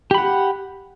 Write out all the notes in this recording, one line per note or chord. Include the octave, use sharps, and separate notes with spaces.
G4 F#5 B5